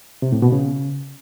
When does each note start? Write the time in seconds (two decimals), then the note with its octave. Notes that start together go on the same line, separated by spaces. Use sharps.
0.22 C3
0.32 A2
0.42 B2
0.52 C#3